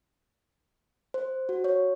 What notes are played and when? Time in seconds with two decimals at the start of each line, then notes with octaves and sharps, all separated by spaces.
1.14 C5
1.49 F#4
1.64 C#5